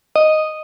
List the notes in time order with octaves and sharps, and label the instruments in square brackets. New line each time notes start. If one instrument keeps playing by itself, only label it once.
[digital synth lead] D#5